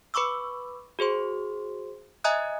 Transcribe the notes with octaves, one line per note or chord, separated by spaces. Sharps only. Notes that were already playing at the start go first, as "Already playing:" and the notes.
B4 B5 C#6 D6 E6
F#4 G#4 C5 C6
D#5 E5 G#5 A#5 D#6 F#6